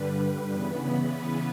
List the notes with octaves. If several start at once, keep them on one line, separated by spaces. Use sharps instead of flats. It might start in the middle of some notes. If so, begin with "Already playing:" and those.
Already playing: G2 D3 G3 B4
C#3 E3 B3